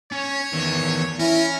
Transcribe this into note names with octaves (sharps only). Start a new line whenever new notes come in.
C#4 C#5
E2 D#3
C#4 E4 A#4